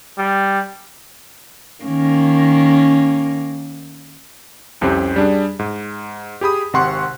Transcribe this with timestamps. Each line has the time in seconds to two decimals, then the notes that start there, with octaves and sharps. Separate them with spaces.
0.18 G3
1.84 D#3 A#3 C#4
4.81 C2 F2 C4 C#4 G4
5.16 G3 D4 G#4
5.59 G#2
6.41 G4 G#4 B5 D#6
6.73 G#1 C3 F#5 C6 C#6 F#6